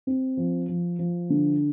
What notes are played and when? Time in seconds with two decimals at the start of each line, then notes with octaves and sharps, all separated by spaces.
0.07 C4
0.37 F3
0.69 F3
0.99 F3
1.30 D3